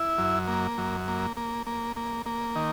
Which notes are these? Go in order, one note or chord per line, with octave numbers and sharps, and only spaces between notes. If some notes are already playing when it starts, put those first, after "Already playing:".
Already playing: E4
F#2
A#3
F#2
A#3
A#3
A#3
A#3
A#3
D#3